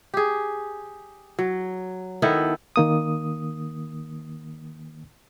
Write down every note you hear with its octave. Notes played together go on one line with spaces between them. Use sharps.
G4 G#4
F#3
D#3 B3 E4 A4
D#3 A#3 D#6